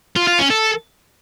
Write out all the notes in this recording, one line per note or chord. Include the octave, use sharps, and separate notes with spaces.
F4
F4
C#4
A4